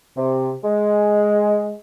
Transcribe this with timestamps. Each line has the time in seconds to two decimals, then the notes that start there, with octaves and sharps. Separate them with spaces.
0.17 C3
0.64 G#3